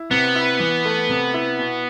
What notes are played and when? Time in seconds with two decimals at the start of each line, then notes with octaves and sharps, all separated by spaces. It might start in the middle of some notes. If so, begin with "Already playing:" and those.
Already playing: E4
0.11 C3 B3
0.35 E4
0.60 E3
0.85 A3
1.09 C3
1.34 E4
1.59 B2